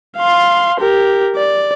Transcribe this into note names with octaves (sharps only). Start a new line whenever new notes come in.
F5 C6
G4 A#4
D5